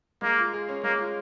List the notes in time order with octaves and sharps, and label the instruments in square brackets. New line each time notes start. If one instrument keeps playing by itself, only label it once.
[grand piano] G#3 [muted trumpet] A#3
[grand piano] F4
G#4
C#4
[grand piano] G#3 [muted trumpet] A#3
[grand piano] F4